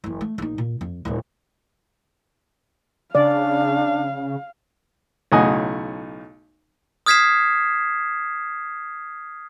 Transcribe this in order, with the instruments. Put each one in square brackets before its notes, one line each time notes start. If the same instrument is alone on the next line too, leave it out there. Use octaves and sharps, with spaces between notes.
[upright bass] F#1 E3
A3
A#1 D#4
A#2
F2
D1 A#2
[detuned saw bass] C#3 [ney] D4 [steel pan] D5 [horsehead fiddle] F5
[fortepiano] B1 A2 C#3 D#5 F#5 G#5
[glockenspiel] D#6 F6 G#6 B6 C7 E7